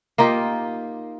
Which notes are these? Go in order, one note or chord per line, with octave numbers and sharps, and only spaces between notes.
A#3 D#4 F4 G4